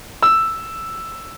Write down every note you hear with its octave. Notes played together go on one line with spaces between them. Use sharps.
E6